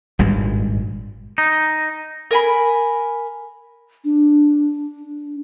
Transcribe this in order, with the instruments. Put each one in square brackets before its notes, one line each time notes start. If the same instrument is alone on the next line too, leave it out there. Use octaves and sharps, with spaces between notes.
[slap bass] G#1 G2 A#2 G#3
[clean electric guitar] D#4
[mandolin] A#4 G#5 B5
[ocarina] D4